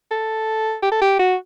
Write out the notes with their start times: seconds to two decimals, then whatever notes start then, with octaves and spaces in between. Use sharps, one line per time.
0.11 A4
0.83 G4
0.92 A4
1.02 G4
1.19 F#4